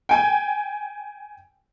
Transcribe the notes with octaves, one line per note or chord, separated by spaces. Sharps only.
G5 G#5